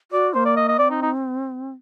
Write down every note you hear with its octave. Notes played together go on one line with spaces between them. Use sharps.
F#4 D5
A#3 C5
D5
D#5
D#5
C4 D5
D#4
D#4